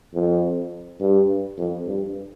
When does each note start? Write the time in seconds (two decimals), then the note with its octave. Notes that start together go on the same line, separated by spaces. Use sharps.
0.14 F2
1.00 G2
1.58 F2
1.87 G2